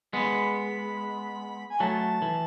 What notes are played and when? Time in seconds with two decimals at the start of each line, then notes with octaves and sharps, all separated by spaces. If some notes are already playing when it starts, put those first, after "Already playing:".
0.13 G#3 B3 B5
1.70 G#5
1.80 F#3 A3 A5
2.22 E3